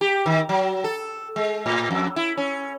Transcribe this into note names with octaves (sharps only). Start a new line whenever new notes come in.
G4
D#3
F#3
A4
G#3
A2
F2
E4
C#4